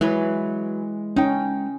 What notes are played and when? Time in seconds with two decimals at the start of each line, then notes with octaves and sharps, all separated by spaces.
0.01 E3 F#3 G#3 B4 C#5
1.16 C#4 D#4 G5